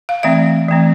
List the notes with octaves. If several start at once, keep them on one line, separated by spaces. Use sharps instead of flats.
F5
E3 A3 C4 E5
E3 A3 C4